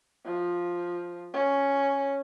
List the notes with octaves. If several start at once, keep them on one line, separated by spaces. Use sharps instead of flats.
F3
C#4